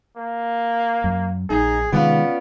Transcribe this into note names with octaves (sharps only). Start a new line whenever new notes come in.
A#3
F#2
A#1 D#4 G#4
C3 D#3 G#3 B3 C#4 F4 D5